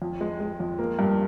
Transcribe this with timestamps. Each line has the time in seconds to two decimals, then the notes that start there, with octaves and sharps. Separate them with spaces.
0.02 F2
0.21 G#3
0.40 G#3
0.60 F2
0.79 A#3
0.99 G2